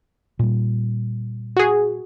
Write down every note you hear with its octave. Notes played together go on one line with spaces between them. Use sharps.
A#2 G3
F#4 G#4